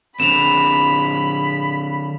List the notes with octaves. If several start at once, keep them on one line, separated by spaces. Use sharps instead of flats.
D3 C4 B5 E7 F7